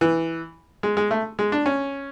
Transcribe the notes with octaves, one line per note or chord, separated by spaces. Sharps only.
E3
G#3
G#3
A3
G#3
D4
C#4